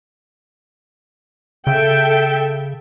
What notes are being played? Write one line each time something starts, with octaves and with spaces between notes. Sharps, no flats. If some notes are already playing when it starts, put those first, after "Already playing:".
C#3 A4 E5 G5